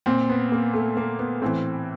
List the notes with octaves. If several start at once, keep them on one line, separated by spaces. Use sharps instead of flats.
A#2 C4
B3
A#3
A3
A#3
B3
A2 E3 C4